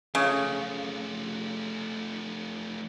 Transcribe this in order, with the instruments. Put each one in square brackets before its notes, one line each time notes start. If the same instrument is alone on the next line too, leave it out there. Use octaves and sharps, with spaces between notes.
[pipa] C#3 [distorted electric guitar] F3 A3